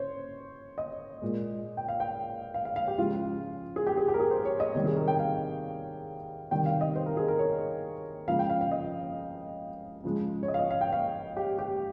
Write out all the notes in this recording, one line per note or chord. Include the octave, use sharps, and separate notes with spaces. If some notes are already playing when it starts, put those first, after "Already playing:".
Already playing: C#3 C5 C#5
D#5
A#2 G#3
G5
F5
G5
F5
F5
F5
G4
C#3 F3 G#3 F4
G#4
G4
G#4
G4
A#4
G#4
C5
C#5
D#5
C3 D#3 G3 C#5
G#4
A#4
G5
F5
C3 D#3 G3 G5
F5
D#5
C5
A#4
G#4
A#4
C#5
C#3 F3 G#3 F5
G5
F5
F5
D#5
C#3 F3 G#3
C#5
D#5
F5
D#5
F5
G5
F5
G4
G4